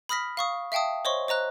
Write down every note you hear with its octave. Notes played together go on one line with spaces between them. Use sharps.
B5 D#6 F6 A#6 B6
F5 C#6 D#6
E5 F5 G5 A5 D#6
C5 C#5 D#5 C6 C#6
C5 D#5 A#5 F#6